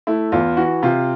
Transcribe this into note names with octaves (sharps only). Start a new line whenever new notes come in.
A3 E4
E2 F4
E3 F#4
C3 F4